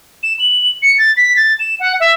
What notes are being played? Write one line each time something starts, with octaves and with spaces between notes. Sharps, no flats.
E7
F#7
C#7
A6
B6
A6
E7
F#5
E5